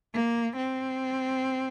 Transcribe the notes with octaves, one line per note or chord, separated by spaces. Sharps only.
A#3
C4